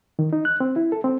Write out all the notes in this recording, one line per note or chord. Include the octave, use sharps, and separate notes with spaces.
D#3
D#4
F#6
C4
E4
A4
C4